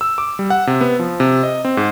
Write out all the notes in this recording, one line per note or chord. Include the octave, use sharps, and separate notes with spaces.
E6
D6
G3
F#5
C3
B3
F3
C3
D#5
C4
G#2